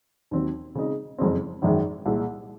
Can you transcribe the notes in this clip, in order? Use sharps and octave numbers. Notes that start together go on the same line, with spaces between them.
D#2 D#3 F#3 C4
C#3 G#3 C4 D#4
F#1 F2 C#3 G#3 C4
G#1 F#2 D#3 G#3
C2 A#2 G#3